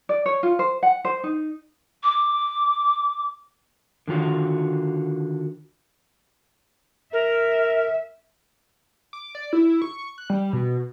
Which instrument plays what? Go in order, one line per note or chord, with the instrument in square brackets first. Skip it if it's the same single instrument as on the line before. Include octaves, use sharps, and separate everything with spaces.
[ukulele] D5
C#5
F4
C5
F#5
C5
D#4
[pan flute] D6
[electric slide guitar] D3 D#3 F4 F#4
[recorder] A#4 [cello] E5
[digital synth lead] D6
D5
E4
C#6
F#6
G3
B2